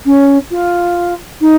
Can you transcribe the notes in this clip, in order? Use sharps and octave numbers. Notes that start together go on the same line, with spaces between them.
C#4
F4
D#4